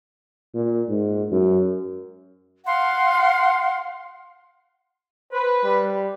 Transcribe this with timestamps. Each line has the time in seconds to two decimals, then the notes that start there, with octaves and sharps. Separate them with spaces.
0.54 A#2
0.89 G#2
1.32 F#2
2.65 F5 F#5 C6
5.32 B4 C5
5.63 G3